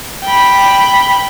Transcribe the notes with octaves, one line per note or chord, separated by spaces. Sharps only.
G5 B5